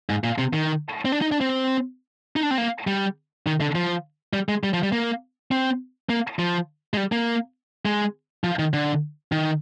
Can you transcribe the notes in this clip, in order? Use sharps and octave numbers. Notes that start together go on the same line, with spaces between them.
G#2
A#2
C3
D#3
C4
D4
D#4
D4
C4
D#4
D4
C4
A#3
G3
D#3
D3
F3
G3
G#3
G3
F3
G3
A#3
C4
A#3
F3
G#3
G3
A#3
G#3
F3
D#3
D3
D#3